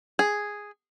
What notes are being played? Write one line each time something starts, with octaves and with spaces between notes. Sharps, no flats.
G#4